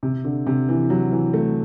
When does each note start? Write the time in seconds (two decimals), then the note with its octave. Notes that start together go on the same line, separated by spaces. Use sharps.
0.03 C3
0.25 D3
0.47 C3
0.69 E3
0.90 F#3
1.12 E3
1.34 A3